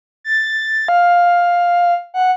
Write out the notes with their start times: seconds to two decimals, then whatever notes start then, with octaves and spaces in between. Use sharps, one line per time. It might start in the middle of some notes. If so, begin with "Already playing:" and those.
0.24 A6
0.88 F5
2.14 F#5